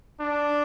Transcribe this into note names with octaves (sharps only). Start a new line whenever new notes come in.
D4